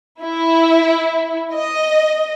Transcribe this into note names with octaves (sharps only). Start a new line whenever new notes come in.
E4
D#5